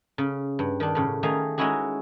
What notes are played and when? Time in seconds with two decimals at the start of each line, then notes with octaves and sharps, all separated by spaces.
0.18 C#3
0.59 G2
0.80 D#3 D4
0.95 A2 C#3
1.23 D#3 A3 D#4 G#4 F5
1.58 G#3 C#4 D#4 E4 F#4 G#4